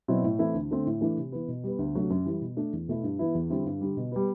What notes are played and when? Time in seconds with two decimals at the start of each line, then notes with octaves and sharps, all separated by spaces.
0.08 B2 F#3 C4 E4
0.24 A2
0.39 E3 A3 C4 E4
0.54 D2
0.71 D3 A3 C4
0.86 A2
1.01 E3 A3 D4
1.17 C3
1.32 E3 B3
1.48 B2
1.64 G3 B3
1.79 D2
1.95 C3 F#3 A3 D4
2.10 F#2
2.25 E3 G3
2.41 B2
2.57 A3 D4
2.73 E2
2.88 B2 A3 E4
3.03 G2
3.19 E3 B3 E4
3.35 E2
3.50 D3 G3 C4 E4
3.65 G2
3.81 D3 G3
3.97 B2
4.12 G3 B3